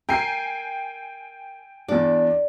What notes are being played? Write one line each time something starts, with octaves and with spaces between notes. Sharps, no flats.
A#4 G5 G#5 C7
E2 D4 D5